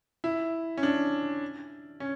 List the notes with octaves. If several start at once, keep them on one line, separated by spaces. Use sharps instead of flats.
E4
C#4
D4
C#4